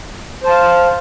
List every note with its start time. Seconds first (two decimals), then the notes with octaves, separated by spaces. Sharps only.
0.43 C5
0.47 A5
0.50 F5